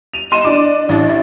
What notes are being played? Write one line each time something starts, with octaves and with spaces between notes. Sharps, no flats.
D#7 F7
D#5 C6 D#7 E7
D4 D6
A1 D4
E5